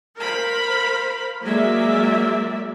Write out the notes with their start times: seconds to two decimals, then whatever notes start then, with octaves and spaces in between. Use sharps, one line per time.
0.19 A#4 C5 F5 B5
1.42 F#3 G#3 A#3 D5 E5